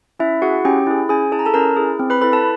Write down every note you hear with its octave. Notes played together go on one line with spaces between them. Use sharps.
C#4 E4 E5
E4 F#4 G#4 F#5
C#4 G4 G5
E4 G#4
C#4 G#4 G#5
E4 G#4 A5
A#5
A4 A5
C#4 A#4 A#5
E4 G#4
C4
B4 B5
E4 A4 B4 B5
A4 A5